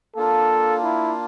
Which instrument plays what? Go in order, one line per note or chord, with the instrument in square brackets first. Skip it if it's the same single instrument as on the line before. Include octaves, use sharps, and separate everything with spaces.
[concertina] A#3 D4 F4 [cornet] A4
[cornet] E4